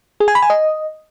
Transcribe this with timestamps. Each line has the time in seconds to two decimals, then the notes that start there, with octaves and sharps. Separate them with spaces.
0.20 G#4
0.28 G#5
0.35 B5
0.42 G#5
0.50 D#5